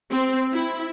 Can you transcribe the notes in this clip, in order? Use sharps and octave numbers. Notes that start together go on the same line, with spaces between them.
C4
E4